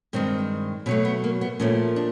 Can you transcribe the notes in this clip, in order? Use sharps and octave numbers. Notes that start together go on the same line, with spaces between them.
G2 D#3 G#3 C4
B2 F#3 A3 C4
B3
A#3
B3
A#2 F3 A3 C#4
D4